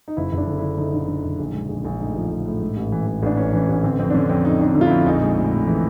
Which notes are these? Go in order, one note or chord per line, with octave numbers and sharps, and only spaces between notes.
D#4
F#1 E4
F#1 D4
D3
D3 E4
D3 D#4
D3
D3
F#1
A#1
G#3
A#1
A#1
A2 D#4
F3
A#1
A2
G#2
A1
E3
E3
A1 D4
E3 C#4
E3 D4
A1 C#4
D3 C4
F2 C4
D4
D3 C#4
F2 C4
F2 D#4
F2 D4
D#4
D3
F4
E4
F2
A#1 D#4
G#3
A2
A2
E3